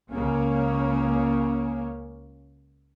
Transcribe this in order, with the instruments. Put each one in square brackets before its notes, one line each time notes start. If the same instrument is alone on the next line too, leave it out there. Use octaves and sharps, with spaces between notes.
[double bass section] C#2 C#3 A#3 C#4